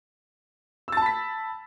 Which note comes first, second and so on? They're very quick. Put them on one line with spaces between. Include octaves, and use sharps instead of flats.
E6 A6 A5 B5 B6